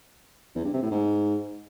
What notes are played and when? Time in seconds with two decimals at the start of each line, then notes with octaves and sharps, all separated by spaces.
0.56 E2
0.65 G2
0.73 C3
0.82 A2
0.91 G#2